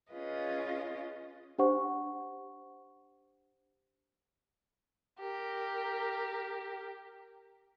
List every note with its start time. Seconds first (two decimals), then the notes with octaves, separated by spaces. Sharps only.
0.11 C#4 F4 G#4 B4 D#5
1.58 D4 G4 C5 F#5 C#6
5.20 G4 A#4